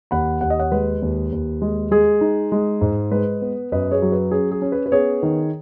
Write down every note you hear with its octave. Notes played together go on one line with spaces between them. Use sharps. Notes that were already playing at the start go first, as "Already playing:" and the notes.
D#2 F#5 B5
D#2 F#5
D#5
C#5 F#5
G#3 B4
D#2
D#2
G#3
G#3 G#4
D#4
G#3
G#2
G#3 B4
B3
F#2 B4 D#5
G#4 C#5
F#3
B4
C#4 G#4
G#4
C#4
B4
B4
B3 G#4 C#5
D#3